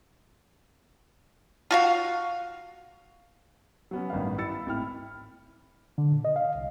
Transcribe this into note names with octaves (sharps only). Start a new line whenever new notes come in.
F4 F#4 F5
F#3 B3 C#4
A1 G2 D#3 B3 F5
E4 E6 A6 C#7
G#1 A2 E4 G5 F6
D3
A#2
D#5
F5
C2